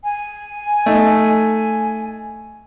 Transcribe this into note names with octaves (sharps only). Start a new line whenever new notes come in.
G#5
A3 D#4